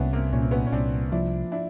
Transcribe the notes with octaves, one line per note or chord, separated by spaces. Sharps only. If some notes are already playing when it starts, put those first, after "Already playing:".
Already playing: C2 B3 C#4 D4 E4
A#3 C4
A#2 C#4
C4
B3 C#4
C#4
C2 C4 D4
F3 D4 E4
D4 E4